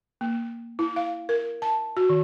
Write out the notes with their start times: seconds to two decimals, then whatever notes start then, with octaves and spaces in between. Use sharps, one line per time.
0.21 A#3
0.79 E4
0.96 F5
1.29 A#4
1.62 A5
1.97 F#4
2.10 D#3